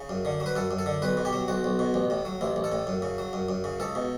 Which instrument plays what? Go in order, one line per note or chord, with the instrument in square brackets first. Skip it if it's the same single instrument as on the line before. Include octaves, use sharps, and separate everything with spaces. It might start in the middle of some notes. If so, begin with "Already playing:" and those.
Already playing: [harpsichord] C#3
F#2
D3
F#3
B4
F#2 A4
F#2
A4
D3
B1 B4
B2
G4
F#3
B1 F#4
B1
B2
A1
A2
F#3
A1 E4
A1
A4
A2
F#2
C#3
F#3
F#2
F#2
C#3
C#2 A4
B2